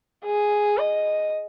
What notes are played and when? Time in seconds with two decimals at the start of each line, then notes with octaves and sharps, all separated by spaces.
0.25 G#4
0.78 D#5